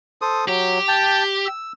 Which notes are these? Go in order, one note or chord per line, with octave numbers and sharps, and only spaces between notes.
A4 C5 D#6
F#3 G4
G5 A5
E6